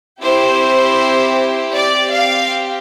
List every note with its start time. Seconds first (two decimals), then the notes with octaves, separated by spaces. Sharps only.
0.23 C4 E4 G4 C5
1.75 C4 G4 D5
2.14 F5